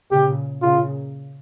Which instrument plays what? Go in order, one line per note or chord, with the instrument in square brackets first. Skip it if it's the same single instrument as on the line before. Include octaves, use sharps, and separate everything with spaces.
[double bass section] A#2 C#3 [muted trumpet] G4
[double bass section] A#2 C#3 [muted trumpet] F4